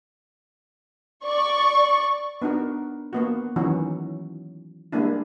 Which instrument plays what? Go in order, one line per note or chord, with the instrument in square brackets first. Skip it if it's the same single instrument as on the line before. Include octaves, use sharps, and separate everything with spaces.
[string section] D5 C#6
[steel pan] B3 D4 D#4 F#4 A#4
A#3 B3 F#4
D#3 E3 F#3 C#4 D#4 F#4
G3 G#3 A#3 D4 E4